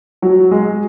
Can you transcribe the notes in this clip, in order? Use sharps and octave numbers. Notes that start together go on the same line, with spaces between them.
F#3
G#3